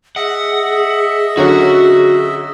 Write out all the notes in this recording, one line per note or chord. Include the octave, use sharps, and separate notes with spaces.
G#4 D#5 E5 F#5
D3 F#3 C#4 F#4